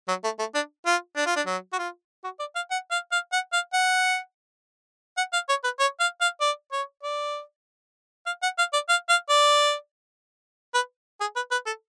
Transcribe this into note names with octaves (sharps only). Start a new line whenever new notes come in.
F#3
A3
A3
D4
F4
D4
F4
D4
F#3
F#4
F4
F#4
D5
F5
F#5
F5
F5
F#5
F5
F#5
F#5
F5
C#5
B4
C#5
F5
F5
D5
C#5
D5
F5
F#5
F5
D5
F5
F5
D5
B4
G#4
B4
B4
A4